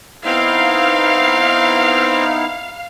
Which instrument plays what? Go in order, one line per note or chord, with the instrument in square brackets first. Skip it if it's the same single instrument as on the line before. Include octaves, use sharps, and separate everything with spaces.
[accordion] B3 D#4 E4 [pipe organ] C4 [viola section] F5